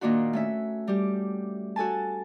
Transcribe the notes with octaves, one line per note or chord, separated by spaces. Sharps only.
A#2 D#3 A#3 D4 F4 F#4
A3 C#4 E5
G3 G4
F#4 A4 G#5 A5